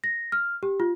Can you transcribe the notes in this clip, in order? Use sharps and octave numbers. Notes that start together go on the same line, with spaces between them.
A#6
F6
G4
F4